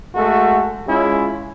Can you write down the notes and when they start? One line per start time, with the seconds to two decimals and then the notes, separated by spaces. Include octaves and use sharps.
0.15 G#3 A3 F#4 A4
0.88 G#3 C#4 E4 F4